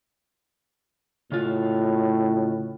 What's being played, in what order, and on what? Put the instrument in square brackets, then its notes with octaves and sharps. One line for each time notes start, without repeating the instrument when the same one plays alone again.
[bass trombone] A2 [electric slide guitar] C#3 F4 F#4